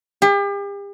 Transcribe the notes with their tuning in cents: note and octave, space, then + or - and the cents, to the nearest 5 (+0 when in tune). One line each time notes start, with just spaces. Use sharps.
G4 +40